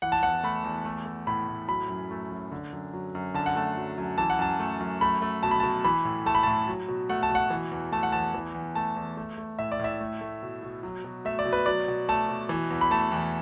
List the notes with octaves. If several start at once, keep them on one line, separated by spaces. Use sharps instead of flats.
E3 F#5
A5
E2 F#5
A3 B5
E2
A3
A3
A2 B5
A2
F#3 B5
F#2
A3
F#2
D3
F#2
F#3
F#2
D3 A5
F#5
A3 A5
F#3
F#2
E3 A5
F#5
F#2 A5
A3
F#2
A3 B5
A3
B2 A5
B5
A5
B2
E3 B5
A2
A3 A5
B5
A2 A5
F#3
B2
A3 F#5
A5
B2
F#5
E3
E2
A3 A5
F#5
E2 A5
E3
E2
A3 A5
E2
A3
A3
A2 E5
D5
A2 E5
A3
A3
B2
B2
F#3
B2
A3 E5
D5
B2
B4
F#3 D5
B2
A3 A5
B2
E3
E2
B5
A3 A5
E2